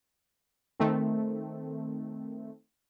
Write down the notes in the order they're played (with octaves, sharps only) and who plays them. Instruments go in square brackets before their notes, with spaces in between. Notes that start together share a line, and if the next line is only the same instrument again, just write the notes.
[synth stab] D#3 A3 C4